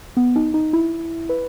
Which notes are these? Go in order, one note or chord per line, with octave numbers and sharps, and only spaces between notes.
B3
D#4
D#4
E4
B4